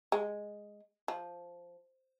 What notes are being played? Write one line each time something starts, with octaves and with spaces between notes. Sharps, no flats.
G#3
F3